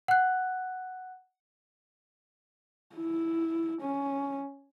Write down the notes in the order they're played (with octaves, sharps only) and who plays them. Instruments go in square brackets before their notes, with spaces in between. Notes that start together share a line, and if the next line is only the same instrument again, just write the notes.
[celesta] F#5 F#6
[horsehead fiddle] E4
C#4